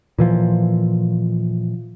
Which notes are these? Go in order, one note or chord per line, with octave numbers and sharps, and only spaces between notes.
A#2 E3 F3